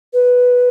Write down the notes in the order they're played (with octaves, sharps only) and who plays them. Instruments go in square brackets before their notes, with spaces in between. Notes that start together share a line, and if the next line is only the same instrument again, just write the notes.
[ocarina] B4